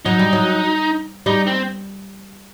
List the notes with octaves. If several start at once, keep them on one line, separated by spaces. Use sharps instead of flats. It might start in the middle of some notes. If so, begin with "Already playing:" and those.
F#3 D#4
G3
F#3
G3 D#4
C4